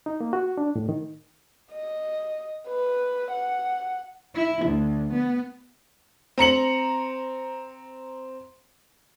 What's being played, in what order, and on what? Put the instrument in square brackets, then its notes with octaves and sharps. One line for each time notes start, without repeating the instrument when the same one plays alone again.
[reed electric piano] D#4
A#3
F#4
D4
A2
D#3
[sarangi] D#5
B4
F#5
[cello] E4
D2
B3
[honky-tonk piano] C4 A#5 C#7 F#7